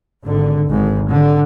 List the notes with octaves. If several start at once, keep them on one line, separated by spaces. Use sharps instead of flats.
G#1 D3
G#1 G#2
D3